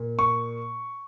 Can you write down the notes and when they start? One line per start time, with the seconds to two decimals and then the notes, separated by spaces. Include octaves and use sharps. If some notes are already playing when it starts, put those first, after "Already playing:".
Already playing: A#2
0.19 C#6